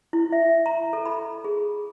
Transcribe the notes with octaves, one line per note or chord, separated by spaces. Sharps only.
E4
E5
A#5
A4
B5
G#4